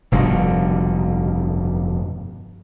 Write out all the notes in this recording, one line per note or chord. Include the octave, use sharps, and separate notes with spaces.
F1 G2 B2 D3